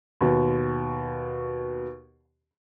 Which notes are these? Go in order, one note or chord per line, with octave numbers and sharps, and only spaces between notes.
D#2 B2